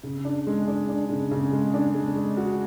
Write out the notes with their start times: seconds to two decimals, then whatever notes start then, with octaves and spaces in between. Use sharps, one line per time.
0.03 C#3
0.25 D4
0.47 G#3
0.68 D4
0.89 D4
1.10 C#3
1.31 C#3
1.52 G#3
1.74 D4
1.95 G#3
2.16 G#3
2.37 F#4